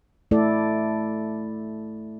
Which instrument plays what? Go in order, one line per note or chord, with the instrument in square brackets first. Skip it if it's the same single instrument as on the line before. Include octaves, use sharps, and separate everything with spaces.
[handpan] A3 E4 A4 D5